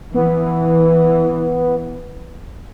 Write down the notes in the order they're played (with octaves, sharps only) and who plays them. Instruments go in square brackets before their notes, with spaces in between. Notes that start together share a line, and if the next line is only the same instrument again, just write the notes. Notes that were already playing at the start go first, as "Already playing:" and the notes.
[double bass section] E3 [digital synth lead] B3